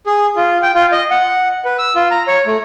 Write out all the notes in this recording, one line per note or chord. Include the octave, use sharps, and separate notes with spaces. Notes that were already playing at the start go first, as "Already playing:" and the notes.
G#4
F4
G5
F4
D#5
F#5
B4
E6
F4
A#5
C#5
A3